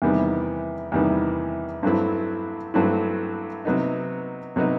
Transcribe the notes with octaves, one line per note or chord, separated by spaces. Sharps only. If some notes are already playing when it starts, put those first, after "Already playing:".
E2 C3 D#3 G3 B3
E2 C3 D#3 G3 B3
G2 F#3 A3 C4 E4
G2 F#3 A3 C4 E4
C3 F#3 B3 D#4
C3 F#3 B3 D#4